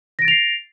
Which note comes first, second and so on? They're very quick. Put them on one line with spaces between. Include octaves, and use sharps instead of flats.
A#6 D7 A6 F7 C7